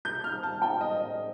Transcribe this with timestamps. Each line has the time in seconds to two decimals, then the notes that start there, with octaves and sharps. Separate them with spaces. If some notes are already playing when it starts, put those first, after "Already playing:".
0.05 G6
0.24 F6
0.43 A5
0.62 G5
0.81 D#5
1.00 D#5